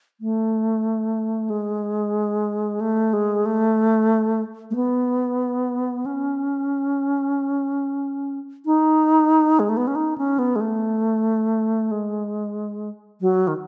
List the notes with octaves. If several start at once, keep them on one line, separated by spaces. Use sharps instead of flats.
A3
G#3
A3
G#3
A3
A3
B3
C#4
D#4
G#3
A3
B3
C#4
D#4
C#4
B3
G#3
A3
G#3
F#3
D#3